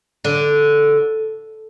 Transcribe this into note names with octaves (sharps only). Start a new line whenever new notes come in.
D3